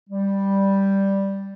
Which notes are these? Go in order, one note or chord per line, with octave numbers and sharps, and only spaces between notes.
G3